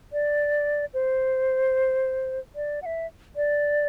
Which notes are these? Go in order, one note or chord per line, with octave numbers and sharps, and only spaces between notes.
D5
C5
D5
F#5
E5
D5